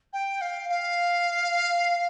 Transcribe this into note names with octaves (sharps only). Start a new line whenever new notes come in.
G5
F5
F5